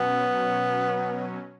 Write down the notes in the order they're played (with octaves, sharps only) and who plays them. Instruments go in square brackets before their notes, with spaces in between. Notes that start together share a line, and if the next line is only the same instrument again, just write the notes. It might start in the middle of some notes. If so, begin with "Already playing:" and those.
Already playing: [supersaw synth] B2 F#3 C#4 [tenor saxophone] B3